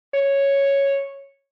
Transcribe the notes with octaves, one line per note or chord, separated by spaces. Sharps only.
C#5